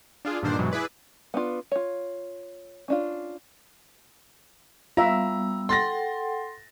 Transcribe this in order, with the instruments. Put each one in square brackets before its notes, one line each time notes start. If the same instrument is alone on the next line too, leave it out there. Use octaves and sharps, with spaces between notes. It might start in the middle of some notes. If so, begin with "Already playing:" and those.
[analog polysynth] D4 F4 G#4
G2 A#2 D3 D#3 D4 C5
G2 B2 E3 F#3 G#3
E4 G#4 B4 D5
[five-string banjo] B3 D4 F4
F4 C#5
C#4 D4 F4
[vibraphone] G3 B3 E6 [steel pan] F4 E5 [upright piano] A#5
[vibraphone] A4 F#5 G5 [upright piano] C6 A6 A#6